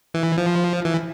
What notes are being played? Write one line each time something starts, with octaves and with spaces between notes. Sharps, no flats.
E3
F3
E3